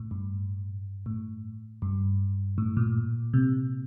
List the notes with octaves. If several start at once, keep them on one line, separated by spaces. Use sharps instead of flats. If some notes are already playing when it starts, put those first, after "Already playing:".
Already playing: A2
G2
A2
G2
A2
A#2
C3